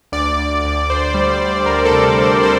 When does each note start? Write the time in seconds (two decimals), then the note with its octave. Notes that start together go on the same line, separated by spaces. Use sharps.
0.12 D2 D5
0.38 D2
0.64 D2
0.90 D2 C5
1.14 G3
1.40 G3
1.66 D2 A#4
1.85 A4
1.91 C3
2.05 A4
2.18 D2
2.23 C5
2.43 G3 C5